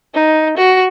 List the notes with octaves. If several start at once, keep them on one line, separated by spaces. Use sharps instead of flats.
D#4
F#4